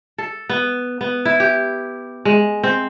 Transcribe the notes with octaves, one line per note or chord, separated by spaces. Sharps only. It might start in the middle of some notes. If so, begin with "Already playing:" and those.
A4
B3
B3
E4
G4
G#3
C4